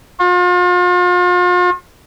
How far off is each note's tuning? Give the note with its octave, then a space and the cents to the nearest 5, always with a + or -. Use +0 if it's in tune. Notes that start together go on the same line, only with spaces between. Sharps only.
F4 +40